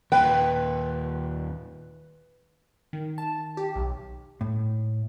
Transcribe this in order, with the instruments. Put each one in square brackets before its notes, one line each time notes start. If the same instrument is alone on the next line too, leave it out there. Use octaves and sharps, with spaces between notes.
[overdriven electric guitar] D#2 A#2 [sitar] B4 [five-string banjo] G5
[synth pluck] D#3
A5
G4
B1
[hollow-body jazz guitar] A2